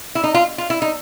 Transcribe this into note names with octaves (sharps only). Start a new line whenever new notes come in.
E4
D#4
F4
F4
E4
D#4